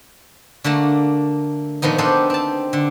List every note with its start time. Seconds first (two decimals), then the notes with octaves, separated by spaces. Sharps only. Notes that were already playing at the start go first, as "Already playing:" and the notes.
0.64 D3 A3 A#3 A5
1.82 A#2 D#3 F3 B3 D#4
1.98 B3 D4 D#4 G4 A4 C5
2.30 C4 A5
2.73 D3